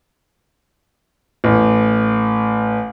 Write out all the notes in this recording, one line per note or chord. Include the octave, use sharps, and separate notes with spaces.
A1